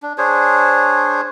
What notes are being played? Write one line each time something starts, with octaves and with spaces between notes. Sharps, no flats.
D4
D4 G#4 C5 C#5